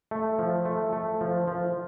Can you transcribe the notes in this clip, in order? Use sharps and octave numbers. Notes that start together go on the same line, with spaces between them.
A3
F3
A3
A3
F3
F3